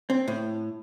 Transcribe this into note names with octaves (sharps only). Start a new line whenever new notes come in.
C4
A2